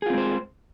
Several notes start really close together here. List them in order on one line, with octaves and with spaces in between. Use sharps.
G#4 F4 C4 G#3 C5